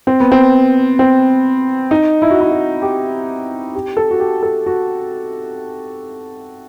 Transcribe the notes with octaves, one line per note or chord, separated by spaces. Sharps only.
C4
B3
C4
C4
D#4
E4
F#4
E4
F#4
G4
G4
A4
F#4
G4
A4
F#4